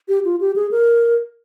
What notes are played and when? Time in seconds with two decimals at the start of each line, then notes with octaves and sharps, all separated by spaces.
0.08 G4
0.25 F4
0.41 G4
0.56 G#4
0.71 A#4